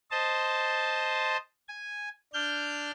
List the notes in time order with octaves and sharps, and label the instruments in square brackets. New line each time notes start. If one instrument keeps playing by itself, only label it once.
[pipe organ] C5 D#5 A5
G#5
D4 F6 G6